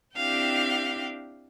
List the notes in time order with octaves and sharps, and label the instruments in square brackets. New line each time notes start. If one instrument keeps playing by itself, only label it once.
[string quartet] C4 D4 E4 G4 F5 G5